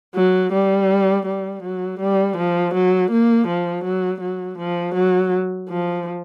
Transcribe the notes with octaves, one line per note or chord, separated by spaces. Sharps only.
F#3
G3
G3
F#3
G3
F3
F#3
A#3
F3
F#3
F#3
F3
F#3
F3